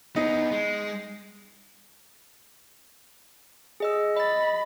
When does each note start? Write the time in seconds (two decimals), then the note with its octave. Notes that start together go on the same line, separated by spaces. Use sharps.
0.16 B3 D#4 G#4
0.51 G#3
3.80 G#4 D#5 E6
4.17 D#5 B5 A6